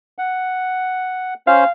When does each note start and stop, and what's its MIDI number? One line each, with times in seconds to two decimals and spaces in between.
0.18 1.34 78
1.47 1.64 61
1.47 1.64 72
1.47 1.71 77